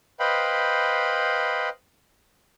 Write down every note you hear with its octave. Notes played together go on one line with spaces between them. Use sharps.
B4 C5 D#5 F5 G5 B5